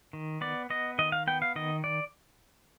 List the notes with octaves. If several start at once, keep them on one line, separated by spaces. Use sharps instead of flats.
D#3
B3 D5
B3 D#5
D#3 D#5
F5
B3 G5
F5
D#3 D#5
D5